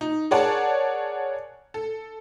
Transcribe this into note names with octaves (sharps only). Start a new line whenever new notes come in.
D#4
G#4 A#4 C#5 D5 F#5 A5
A4